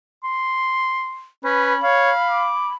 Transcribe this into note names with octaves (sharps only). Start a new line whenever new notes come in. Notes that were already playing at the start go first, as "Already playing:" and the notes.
C6
C#4 B4 B5
C#5 F5
D6